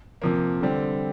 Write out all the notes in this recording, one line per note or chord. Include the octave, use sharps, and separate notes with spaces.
C3 F3 A#3
D3 G3 C4